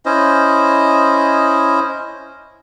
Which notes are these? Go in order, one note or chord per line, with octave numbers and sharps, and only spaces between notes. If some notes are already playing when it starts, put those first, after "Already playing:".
C#4 E4 C5 D#5